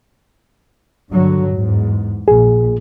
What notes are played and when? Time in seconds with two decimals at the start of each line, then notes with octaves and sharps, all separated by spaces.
1.11 G2 D3 F#3
1.54 E2 G#2
2.28 A#1 A#2 G#4